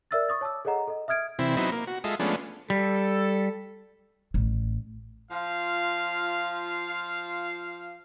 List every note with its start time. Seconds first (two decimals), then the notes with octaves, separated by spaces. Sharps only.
0.11 A#4 D5 E5 E6 F6 A6
0.28 C#6 D#6 A6
0.41 C#5 A5 D6 E6
0.65 G#4 A4 C#5 D#5 F#5 A#5
0.88 A4 D#5
1.08 E5 D#6 F6 G#6 D7
1.39 C3 E3 C4 E4
1.57 F#3 B3 C4 D#4 E4
1.72 A#3
1.87 F#4
2.04 G#3 F4 A4 D#5 E5
2.20 F3 G#3 A3 B3 C#4 D4
2.70 G3 A4
4.34 A1
5.31 F3 F4 F5